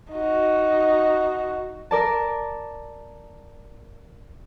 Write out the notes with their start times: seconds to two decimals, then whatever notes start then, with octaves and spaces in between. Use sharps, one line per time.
0.13 D#4 F#4
1.91 A#4 D5 A5